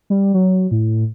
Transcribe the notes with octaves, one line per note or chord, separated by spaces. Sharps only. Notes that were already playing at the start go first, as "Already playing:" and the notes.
G3
F#3
A2